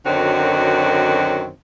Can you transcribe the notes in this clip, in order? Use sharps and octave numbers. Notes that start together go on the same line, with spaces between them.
F#2 D3 D#3 C4 F#4 C#5